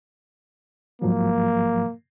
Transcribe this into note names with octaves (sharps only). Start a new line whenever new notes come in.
G#2 F3 F#3 A#3